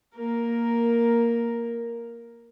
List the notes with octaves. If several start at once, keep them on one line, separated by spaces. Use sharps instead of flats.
A#3 A#4